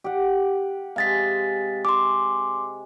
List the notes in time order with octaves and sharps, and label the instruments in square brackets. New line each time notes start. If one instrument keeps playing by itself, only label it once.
[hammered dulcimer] G4 F#5
[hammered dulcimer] C3 G#3 [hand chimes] F5 A6 B6
[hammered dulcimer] G#5 [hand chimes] C6 D6